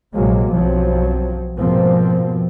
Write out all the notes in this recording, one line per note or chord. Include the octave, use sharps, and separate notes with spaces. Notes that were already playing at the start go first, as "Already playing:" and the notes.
A#1 C3 F#3 G#3 A#3
B1 G2 F3 F#3 C4
F2 G#2 B2 F3 A#3 C4